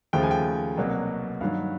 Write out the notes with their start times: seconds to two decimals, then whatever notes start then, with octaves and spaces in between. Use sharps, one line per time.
0.13 D#2 C#3 F3 A3 G5
0.23 G#5
0.31 G5
0.77 C2 B2 F#3 A#3
1.41 G2 D#3 F#3 F5